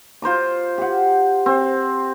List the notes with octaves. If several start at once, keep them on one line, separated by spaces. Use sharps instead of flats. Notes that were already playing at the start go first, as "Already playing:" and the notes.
F4 C5 A#5 D6
G4 F#5
C4